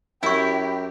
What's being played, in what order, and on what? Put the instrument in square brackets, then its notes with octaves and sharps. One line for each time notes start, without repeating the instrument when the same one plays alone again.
[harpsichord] F#2 [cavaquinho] E4 [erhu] G4 [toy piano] G#5 C#6